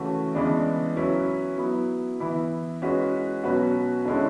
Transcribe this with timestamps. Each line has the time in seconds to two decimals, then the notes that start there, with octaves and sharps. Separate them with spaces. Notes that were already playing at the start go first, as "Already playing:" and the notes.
Already playing: C#3 E3 A3 C#4 F#4
0.35 C#3 E3 G#3 B3 D4
0.97 F#3 C#4 E4 B4
1.58 F#3 B3 E4
2.20 E3 B3 E4
2.82 G#3 C#4 F#4 B4
3.44 B2 F#3 C#4 F#4 B4
4.05 D3 G#3 C#4 E4